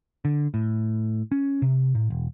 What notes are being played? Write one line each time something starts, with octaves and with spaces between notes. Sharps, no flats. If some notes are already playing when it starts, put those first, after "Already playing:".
D3
A2
C#4
C3
A2
E1